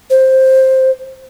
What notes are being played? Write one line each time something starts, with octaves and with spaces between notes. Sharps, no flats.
C5